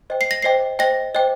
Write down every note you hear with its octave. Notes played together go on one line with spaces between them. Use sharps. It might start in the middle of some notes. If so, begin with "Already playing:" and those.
C5 D#5 G5
C7
A#6
C5 D#5 G5 C7
C5 D#5 G5 A#6
C5 D#5 G5